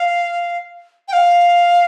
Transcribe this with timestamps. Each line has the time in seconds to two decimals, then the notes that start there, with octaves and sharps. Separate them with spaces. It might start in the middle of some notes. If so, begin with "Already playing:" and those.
Already playing: F5
1.08 G5
1.13 F5